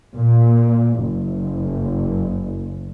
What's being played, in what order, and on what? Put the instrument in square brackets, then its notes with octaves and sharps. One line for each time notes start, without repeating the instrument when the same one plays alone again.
[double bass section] A#2
F#1